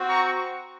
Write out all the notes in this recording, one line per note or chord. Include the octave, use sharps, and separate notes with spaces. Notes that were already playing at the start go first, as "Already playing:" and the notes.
Already playing: C4 F#4
A#5 C#6